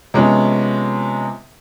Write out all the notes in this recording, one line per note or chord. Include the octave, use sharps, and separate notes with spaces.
C3 F3 G#3 B3 C#4